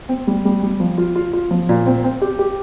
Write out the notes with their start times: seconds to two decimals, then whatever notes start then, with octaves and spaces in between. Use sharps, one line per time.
0.09 C4
0.27 G3
0.45 G3
0.63 G3
0.80 F3
0.98 F4
1.16 F4
1.33 F4
1.51 F3
1.69 A#2
1.86 C4
2.04 C4
2.22 G4
2.39 G4